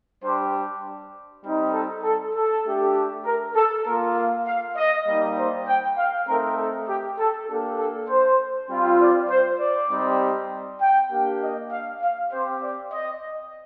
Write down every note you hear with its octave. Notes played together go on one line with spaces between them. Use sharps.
G3 D4 G4 C5
G3 C4 D#4
A4
A4
A4
A3 D4 G4
A#4
A4
A#3 F4 A#4
F5
F5
D#5
G3 A#3 D#4
C5
G5
F5
A3 C4 D#4 A#4
A4
G4
A4
A#3 D4 G4 A4
A4
C5
G3 C4 F4
D5
C5
D5
G3 C4 D#4 G4
G5
A#3 D4 G4
D#5
F5
F5
C4 G4 C5
D5
D#5